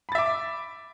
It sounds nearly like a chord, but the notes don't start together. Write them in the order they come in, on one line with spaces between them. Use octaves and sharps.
B5 A6 E5 D6